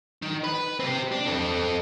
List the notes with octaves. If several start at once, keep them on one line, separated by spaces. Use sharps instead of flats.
D#3
B4
C4 G4
D4
C4 A4